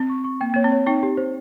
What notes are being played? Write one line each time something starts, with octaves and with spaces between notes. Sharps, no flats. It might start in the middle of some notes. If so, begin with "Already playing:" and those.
Already playing: C4
C#6
C#6
A#3 G5
A#3 C#5
C4
C#5
C4 D#4 G5
G4
C5